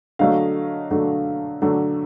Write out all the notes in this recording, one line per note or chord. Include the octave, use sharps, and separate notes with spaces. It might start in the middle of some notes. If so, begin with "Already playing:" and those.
D3 F#3 A3 D#5 F5
D3 F#3 A3
D3 F#3 A3